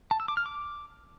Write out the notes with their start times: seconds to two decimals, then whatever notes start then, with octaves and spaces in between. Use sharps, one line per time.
0.11 A5
0.20 E6
0.28 D6
0.37 F6
0.46 D6